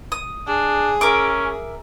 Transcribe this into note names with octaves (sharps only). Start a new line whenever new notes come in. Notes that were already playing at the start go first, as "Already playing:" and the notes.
D#6
D4 G#4
C#4 A#4 E5 D6